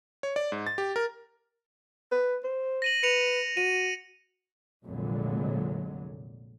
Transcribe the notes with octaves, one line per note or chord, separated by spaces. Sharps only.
C#5
D5
G#2
A6
G4
A#4
B4
C5
A#6 D#7 F#7
B4 C#7 D#7 F7
F#4 D#7
F1 A#1 A#2 D3 F#3 G#3